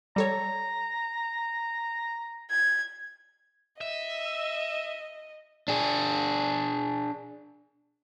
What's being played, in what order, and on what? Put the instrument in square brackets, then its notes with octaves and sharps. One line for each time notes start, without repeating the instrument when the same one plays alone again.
[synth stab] G3 A4 C#5 [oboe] A#5
[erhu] G#6
[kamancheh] D#5 [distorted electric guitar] E5
[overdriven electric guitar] D4 G#4